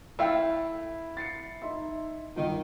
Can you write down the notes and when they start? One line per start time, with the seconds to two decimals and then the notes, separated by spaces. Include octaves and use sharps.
0.19 A3 E4 F5 G5
1.17 A6 C7 C#7
1.62 D#4 E5 C6
2.36 G1 D#3